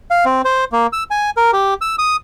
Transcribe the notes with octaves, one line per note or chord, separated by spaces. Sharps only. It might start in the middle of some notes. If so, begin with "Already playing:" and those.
F5
C4
C5
A#3
E6
G#5
A#4
G4
E6
D#6